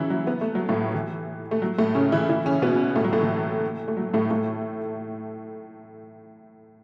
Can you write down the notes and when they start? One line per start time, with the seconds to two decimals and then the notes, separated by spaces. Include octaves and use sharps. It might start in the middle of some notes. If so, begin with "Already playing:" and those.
Already playing: C#3 E3 F#3 C#4 E4
0.10 F#3
0.27 B3
0.41 A3
0.55 F#3
0.69 A2 A3
0.95 E3
1.51 A3
1.62 F#3
1.78 A2 A3
1.95 C#3 C#4
2.12 E3 E4
2.29 E3 E4
2.46 C#3 C#4
2.62 B2 B3
2.96 A2 A3
3.04 F#3
3.13 A2 A3
3.21 E3
3.88 A3
3.97 F#3
4.14 A2 A3
4.31 A2 A3